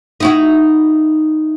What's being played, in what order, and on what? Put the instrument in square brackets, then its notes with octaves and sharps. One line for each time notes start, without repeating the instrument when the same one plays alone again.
[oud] D#4 E4 F#4